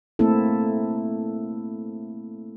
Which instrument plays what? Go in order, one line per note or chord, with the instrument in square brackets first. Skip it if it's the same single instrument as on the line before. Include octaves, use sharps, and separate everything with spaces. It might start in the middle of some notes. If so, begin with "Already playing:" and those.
[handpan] A3 A#3 C4 E4 A4